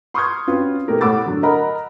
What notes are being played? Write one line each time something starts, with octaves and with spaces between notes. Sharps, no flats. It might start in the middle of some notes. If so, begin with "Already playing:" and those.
C6 C#6 D#6 F6 G6 G#6
C4 C#4 F4 F#4 B4
B2 A3 G4 A#4
A2 A3 F#5 D6 E6 A6
D3 F#3
A#4 D#5 F#5 A#5 B5